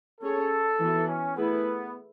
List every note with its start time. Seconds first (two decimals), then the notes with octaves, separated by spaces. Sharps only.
0.21 C#4 G#4 A4 C#5
0.79 E3 B3 F#4
1.08 C#4
1.36 A3 B3 E4 G#4 B4